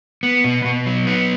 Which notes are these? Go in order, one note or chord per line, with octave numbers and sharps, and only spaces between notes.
B3
B2
B2
F#3
B3